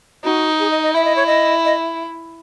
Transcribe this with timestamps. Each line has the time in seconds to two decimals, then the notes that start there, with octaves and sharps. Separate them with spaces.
0.24 D#4 F#4
0.59 G#4
0.71 D#5
0.83 D#5
0.94 E4 E5
1.05 D#5
1.16 C#5
1.26 D#5
1.65 D#5